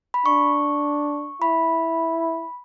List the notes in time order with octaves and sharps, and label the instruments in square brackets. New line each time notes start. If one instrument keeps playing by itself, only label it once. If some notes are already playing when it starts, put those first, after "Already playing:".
[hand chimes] B5
[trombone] D4 [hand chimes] C#6
[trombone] E4 [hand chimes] B5